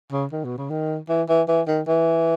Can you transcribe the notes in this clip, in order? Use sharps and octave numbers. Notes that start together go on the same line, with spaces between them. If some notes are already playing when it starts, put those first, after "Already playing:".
C#3
D#3
B2
C#3
D#3
E3
E3
E3
D#3
E3